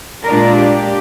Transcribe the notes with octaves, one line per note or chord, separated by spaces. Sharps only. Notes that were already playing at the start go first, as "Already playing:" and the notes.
A#2 G#3 D4 A#4
G4